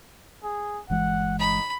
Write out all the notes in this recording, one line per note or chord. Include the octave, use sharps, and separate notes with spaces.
G#4
G1 E3 G#3 F#5
D#4 B5